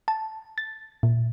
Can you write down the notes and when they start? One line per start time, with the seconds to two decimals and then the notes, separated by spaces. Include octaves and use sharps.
0.08 A5
0.58 A6
1.03 A#2